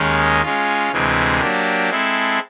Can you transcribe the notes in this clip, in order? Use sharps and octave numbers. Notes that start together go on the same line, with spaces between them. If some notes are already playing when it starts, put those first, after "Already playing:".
Already playing: D#2 D#3 G#3 C#4
G#3 C#4 F4
D2 C3 E3 G#3 C4
F#3 A#3 D4 G4
G#3 C4 E4 A4